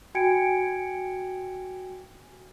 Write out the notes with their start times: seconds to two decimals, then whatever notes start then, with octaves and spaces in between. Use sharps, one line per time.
0.15 F#4 G5 G#5 G#6 C#7 D7